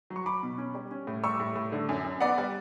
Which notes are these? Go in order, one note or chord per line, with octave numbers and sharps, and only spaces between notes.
F#3
C#6
F#3 B5 D6
B2
C#4
G3
C#4
A2
G3 C#6 E6
A2
A2
D3
F#2
F#2
B3 D5 F#5
G3